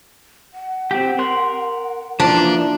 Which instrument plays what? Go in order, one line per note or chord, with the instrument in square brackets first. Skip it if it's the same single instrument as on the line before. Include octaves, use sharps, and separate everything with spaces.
[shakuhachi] F#5
[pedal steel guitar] C4 G4
A#4 C6 F#6
[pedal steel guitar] E3 F3 A#3 [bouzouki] D4 [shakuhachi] F4